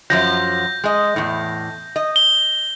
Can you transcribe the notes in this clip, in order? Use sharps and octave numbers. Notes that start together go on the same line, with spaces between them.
F#2 F3 F#3 G6 A#6
G#3 D#5
E2 A2
D#5
G7